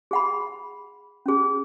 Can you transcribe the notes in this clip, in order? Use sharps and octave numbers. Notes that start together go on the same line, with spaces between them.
G#4 F#5 B5
C#4 G#4